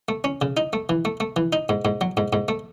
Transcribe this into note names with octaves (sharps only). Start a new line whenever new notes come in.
A3
C#4
C#3
D#4
A3
E3
A3
A3
E3
D#4
G#2
G#2
F#3
G#2
G#2
A3